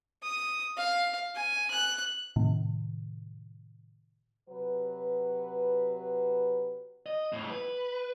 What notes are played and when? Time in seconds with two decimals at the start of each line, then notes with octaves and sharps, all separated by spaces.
0.23 D#6
0.77 F5
1.35 G#5
1.70 F#6
2.36 A2 C3 D#3
4.49 C3 F#3 F#4 B4
7.06 D#5
7.33 F2 A2
7.50 B4